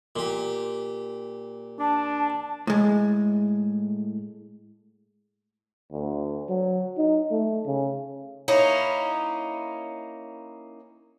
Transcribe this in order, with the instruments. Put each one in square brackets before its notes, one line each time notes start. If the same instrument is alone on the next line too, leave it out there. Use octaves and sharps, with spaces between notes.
[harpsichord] A#2 G4
[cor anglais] D4 [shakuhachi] A5
[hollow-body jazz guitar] A2 G#3
[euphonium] D2
F#3
D#4
A3
C#3
[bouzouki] A#3 C#4 D#4 E4